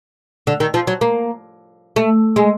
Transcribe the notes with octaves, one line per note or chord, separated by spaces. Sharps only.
D3
D#3
F3
F#3
A#3
A3
G#3